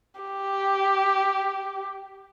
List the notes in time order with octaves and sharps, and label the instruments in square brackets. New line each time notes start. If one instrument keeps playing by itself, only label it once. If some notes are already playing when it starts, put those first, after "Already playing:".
[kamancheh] G4